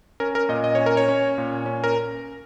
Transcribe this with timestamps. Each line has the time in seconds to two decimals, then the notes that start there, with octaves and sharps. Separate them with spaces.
0.20 C#4 A#4
0.35 A#4
0.49 A#2 D#5
0.64 D#5
0.75 C#4 C#5
0.86 A#4
0.97 C#5
1.08 C#4
1.38 A#2
1.66 C#4
1.84 A#4